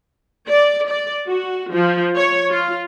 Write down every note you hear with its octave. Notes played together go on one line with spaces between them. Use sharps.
D5
D5
F#4
F3
C#5
F4